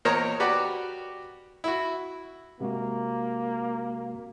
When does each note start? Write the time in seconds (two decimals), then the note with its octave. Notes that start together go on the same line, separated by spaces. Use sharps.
0.05 E2 A#2 A#4 C5 C#5 D#5
0.40 F#4 G4 B4 D5 F#5
1.64 E4 F#4
2.60 C3 G#3 A#3 F#4